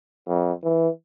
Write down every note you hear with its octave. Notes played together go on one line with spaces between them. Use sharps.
F2
E3